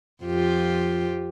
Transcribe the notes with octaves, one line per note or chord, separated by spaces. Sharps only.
F2 F4 G4